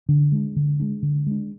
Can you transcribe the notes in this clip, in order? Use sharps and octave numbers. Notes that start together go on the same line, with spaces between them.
D3
G#3 D4
D3
G#3 D4
D3
G#3 D4